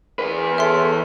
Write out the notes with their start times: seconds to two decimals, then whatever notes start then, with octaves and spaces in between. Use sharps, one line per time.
0.19 E2 B4
0.58 A4 C#5 E5 C6